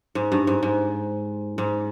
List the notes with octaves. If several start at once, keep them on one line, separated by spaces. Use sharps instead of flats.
G#2
G2
G#2
G#2
G#2